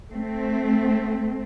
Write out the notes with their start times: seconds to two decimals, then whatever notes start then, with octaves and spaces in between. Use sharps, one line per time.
0.11 A3 C4